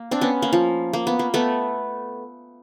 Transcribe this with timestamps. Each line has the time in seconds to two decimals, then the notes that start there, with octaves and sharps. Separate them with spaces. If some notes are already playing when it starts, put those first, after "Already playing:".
Already playing: A#3
0.11 C4 D4
0.21 B3 C#4
0.42 A#3
0.53 F3
0.93 A#3
1.07 B3
1.19 A#3
1.34 A3 B3